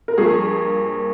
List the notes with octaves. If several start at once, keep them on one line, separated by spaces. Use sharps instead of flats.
A#4
G2 F3 A#3 G#4